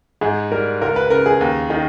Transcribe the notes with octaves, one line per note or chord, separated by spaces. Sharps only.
G#2 G#4
G3 A#4
C#2 A#4
B4
C#3 A#4
G#4
D#2
D#3